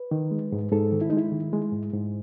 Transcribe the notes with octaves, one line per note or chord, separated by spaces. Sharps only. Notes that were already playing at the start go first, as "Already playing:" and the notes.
Already playing: B4
D#3
G#3
G#2
G#2 A4
D#3
E4
D#4
G#3 E4
D#3
G#3
G#2
G#2